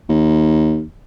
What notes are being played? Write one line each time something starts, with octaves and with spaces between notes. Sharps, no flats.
D#2